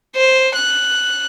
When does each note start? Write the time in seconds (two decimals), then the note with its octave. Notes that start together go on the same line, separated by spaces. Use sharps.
0.16 C5
0.56 F#6